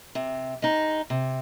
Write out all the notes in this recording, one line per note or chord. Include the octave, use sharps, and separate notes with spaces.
C3
G#3 D#4
C3